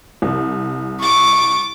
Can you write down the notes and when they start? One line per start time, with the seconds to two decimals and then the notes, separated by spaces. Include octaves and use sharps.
0.22 C2
1.02 C#6 D6 A6